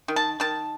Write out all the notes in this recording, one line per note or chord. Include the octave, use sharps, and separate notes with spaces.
D#3
A5
D#3 A5